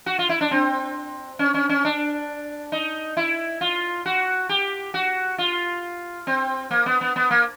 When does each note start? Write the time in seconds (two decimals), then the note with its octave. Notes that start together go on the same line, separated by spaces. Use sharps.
0.06 F#4
0.19 F4
0.29 E4
0.41 D4
0.51 C4
1.39 C#4
1.54 C#4
1.69 C#4
1.85 D4
2.72 D#4
3.17 E4
3.61 F4
4.06 F#4
4.49 G4
4.94 F#4
5.38 F4
6.27 C4
6.71 A#3
6.86 B3
7.01 B3
7.16 B3
7.31 A#3